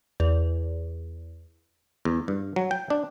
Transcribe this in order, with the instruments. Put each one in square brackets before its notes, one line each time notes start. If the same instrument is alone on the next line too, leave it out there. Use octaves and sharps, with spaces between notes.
[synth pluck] E2
[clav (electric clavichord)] E2
G2
F#3
G5
D4